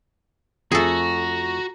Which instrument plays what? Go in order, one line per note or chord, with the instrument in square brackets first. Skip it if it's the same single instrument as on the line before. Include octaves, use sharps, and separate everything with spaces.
[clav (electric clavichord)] F2 A3 [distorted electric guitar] F#4 [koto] G#4 A4 [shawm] A#5